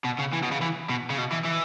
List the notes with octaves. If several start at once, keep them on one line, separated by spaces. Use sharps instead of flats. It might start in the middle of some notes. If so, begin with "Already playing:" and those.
B2
C#3
E3
B2
C#3
E3
B2
C#3
B2
E3
E3